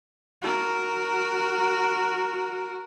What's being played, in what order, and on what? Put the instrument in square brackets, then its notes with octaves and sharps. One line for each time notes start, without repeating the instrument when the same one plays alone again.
[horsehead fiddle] F#4 A#4